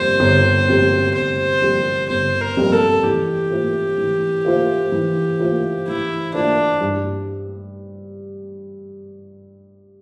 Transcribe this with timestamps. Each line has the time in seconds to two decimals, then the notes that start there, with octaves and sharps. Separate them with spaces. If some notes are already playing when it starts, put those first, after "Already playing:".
Already playing: G1 F2 C3 G3 A#3 C5
0.20 G1
0.68 F2 C3 G3 A#3
1.15 G1 C5
1.62 F2 C3 G3 A#3
2.09 G1 C5
2.41 A#4
2.57 F2 C3 G3 A#3
2.73 A4
3.04 E3 G4
3.51 A#3 F4 C5 E5
3.98 E3
4.45 A#3 F4 C5 E5
4.92 E3
5.39 A#3 F4 C5 E5
5.88 E3 E4
6.34 A#3 D4 F4 C5 E5
6.81 G2